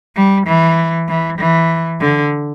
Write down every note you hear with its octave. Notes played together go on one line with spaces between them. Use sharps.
G3
E3
E3
E3
D3